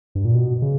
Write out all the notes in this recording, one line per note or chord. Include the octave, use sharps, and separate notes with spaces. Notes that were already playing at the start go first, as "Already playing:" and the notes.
G2
A#2
B2
C#3